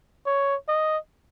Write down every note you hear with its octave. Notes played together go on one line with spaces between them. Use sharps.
C#5
D#5